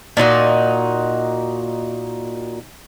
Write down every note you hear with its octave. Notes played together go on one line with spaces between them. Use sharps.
A#2 D#4 F4 F#4